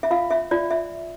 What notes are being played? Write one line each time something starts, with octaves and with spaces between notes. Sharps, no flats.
E5
F4 F5
E5
F4 D5
E5